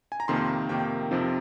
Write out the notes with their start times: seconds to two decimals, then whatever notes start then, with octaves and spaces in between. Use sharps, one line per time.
0.12 G#5
0.20 A#5
0.28 F2 C3 D#3 A#3 C6
0.69 F2 C3 D#3 A#3 G5
1.11 F2 C3 F3 C4 D#4